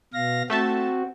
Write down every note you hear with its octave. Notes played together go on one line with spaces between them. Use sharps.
B2 F5 A#6
A3 C4 F#4 E5 A5